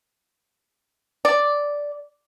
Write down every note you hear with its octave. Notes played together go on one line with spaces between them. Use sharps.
D5